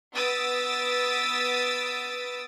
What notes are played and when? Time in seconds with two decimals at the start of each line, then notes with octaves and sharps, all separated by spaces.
0.13 B3 D#6 E6 A6 B6 D7